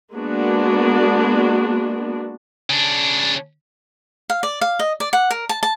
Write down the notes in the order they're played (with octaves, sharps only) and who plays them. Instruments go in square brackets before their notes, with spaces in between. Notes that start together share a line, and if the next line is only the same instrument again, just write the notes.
[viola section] G#3 A#3 B3 D4 F#4
[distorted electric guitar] C#3 D4
[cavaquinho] F5
D5
F5
D#5
D5
F#5
A#4
A5
A5